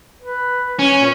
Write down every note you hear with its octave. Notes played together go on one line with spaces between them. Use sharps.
B4
C#4
A#2